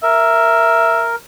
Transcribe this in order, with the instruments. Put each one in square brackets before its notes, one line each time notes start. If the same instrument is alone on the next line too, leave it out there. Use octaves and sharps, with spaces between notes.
[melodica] A#4 [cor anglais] E5